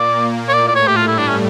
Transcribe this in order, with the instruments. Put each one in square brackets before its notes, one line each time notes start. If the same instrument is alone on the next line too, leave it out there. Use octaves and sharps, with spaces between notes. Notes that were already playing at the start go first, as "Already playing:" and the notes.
Already playing: [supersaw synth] A#2 A#3 [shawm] D5
[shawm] C#5
[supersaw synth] A2 A3 [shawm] D5
[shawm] D5
C#5
G4
[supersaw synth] G2 G3 [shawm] F4
[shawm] E4
D4
C#4